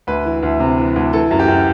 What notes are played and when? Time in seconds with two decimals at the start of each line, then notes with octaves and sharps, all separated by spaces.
0.07 D2 B4
0.25 E3
0.43 D2
0.60 C3
0.78 E3
0.96 D2
1.13 E3 A4
1.31 F#2
1.39 G4
1.48 F#2